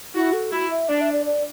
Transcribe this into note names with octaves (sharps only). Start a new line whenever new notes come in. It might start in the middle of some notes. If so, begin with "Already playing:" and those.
E4 F#4
A4
E4 F#4
E5
D4 D5
E5
D5
D5